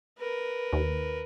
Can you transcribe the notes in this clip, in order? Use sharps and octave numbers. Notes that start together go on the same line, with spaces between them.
A#4 B4
D#2